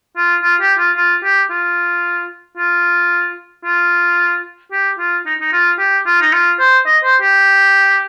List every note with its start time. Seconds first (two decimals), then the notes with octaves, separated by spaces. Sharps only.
0.17 F4
0.43 F4
0.61 G4
0.78 F4
0.96 F4
1.23 G4
1.50 F4
2.57 F4
3.65 F4
4.72 G4
4.98 F4
5.26 D#4
5.41 D#4
5.52 F4
5.79 G4
6.06 F4
6.21 D#4
6.33 F4
6.59 C5
6.86 D#5
7.04 C5
7.22 G4